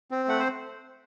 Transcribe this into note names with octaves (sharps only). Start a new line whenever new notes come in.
C4
A3 F#5
C5